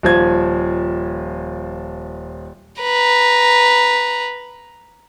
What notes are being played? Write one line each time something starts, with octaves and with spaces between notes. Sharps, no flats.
D#1 F3 G#6
B4 A#5